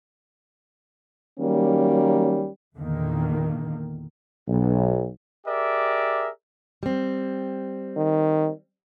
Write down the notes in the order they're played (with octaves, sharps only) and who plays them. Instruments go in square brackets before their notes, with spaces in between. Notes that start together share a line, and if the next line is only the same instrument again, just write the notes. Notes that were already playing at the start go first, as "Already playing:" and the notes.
[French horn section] D#3 F#3 G3 A#3 C#4
[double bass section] E2 A#2 D3 D#3 A#3
[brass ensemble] B1
[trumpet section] G4 G#4 A#4 D5 E5
[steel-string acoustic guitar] G3 C4
[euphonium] D#3